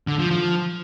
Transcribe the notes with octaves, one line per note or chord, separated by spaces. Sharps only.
D3
F3
F3